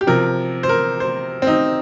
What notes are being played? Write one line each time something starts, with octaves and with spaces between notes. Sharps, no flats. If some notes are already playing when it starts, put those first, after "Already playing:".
G4
C3 F3 A#4
C5
A#4
C5
C4
D#4